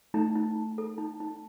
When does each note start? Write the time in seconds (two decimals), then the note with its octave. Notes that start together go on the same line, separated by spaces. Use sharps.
0.14 A3 D#4
0.35 D#4
0.56 D#4
0.78 A4
0.98 D#4
1.20 D#4